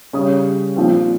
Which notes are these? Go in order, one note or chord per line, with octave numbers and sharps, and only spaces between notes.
C#3 G3 C#4 D#6
A#2 F3 C4